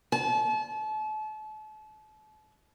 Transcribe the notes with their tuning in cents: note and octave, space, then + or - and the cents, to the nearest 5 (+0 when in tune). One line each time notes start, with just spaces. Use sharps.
A5 -35